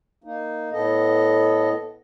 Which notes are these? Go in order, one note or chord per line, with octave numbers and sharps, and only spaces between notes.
A#3 D#4
A2 B3 A4 D#5